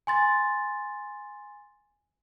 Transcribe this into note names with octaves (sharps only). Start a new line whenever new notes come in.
G#5 C6 A6